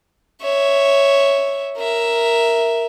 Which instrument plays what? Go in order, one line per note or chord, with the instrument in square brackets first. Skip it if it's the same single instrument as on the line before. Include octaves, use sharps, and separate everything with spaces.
[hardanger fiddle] C#5 E5
A#4 E5